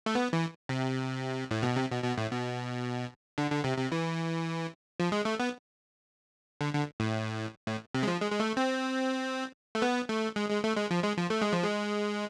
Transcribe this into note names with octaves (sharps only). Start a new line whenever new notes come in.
A3
B3
E3
C3
A2
B2
C3
B2
B2
A2
B2
D3
D3
C3
C3
E3
F3
G#3
A3
B3
D3
D3
A2
A2
C3
G#3
F3
G#3
G#3
A3
C4
A3
B3
A3
G#3
G#3
A3
G#3
F3
G#3
F3
A3
G#3
F3
G#3